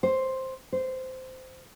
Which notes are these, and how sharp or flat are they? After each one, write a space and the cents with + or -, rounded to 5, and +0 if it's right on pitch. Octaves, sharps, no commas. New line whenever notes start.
C5 +5
C5 -15